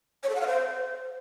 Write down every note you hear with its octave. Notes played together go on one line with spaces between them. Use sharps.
C#5
A4
F#5
F5
C5